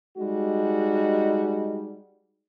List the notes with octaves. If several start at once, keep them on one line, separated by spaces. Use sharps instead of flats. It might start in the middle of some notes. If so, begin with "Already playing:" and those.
G3 G#3 D#4 F#4